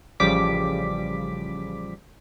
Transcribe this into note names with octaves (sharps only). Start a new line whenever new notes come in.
A1 C#3 F3 G3 D6 B6